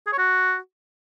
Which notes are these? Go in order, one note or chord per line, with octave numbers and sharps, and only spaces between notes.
G#4
C#5
F#4